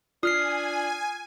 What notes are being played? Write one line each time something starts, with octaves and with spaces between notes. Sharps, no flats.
D4 F4 G#5 D#6 F6 C7